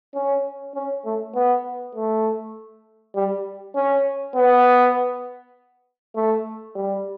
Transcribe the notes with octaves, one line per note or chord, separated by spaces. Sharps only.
C#4
C#4
A3
B3
A3
G3
C#4
B3
A3
G3